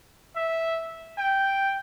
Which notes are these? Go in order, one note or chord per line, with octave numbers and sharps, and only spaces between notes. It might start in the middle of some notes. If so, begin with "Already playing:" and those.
E5
G5